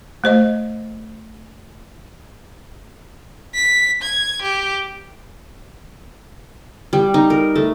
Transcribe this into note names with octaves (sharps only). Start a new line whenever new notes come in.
A3 C5 D#5
B6
G#6
G4
G3
D#4
A#4
A3